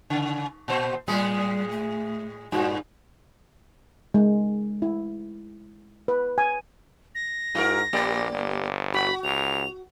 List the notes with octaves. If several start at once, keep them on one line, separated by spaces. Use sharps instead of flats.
C#3
A#2 C5
A2 G3 G#3 G#4
A3
G2 A#2 F#4
G#3
E4
B4
G#5
A#6
G#2 E4 F#4 A#4
A#1 A#3 G4 D5
G1
F#4 B5
C#2 F7